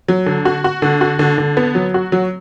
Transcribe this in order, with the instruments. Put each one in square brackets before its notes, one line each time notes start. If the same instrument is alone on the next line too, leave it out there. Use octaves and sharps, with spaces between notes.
[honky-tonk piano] F#3
D3
F#4
F#4
D3
F#4
D3
D3
B3
F#3
F#4
F#3